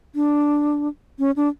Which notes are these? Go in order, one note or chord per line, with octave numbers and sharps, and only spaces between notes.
D4
C#4
D4